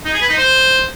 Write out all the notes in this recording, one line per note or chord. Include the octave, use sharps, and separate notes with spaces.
D#4
G#4
B4
D#4
C5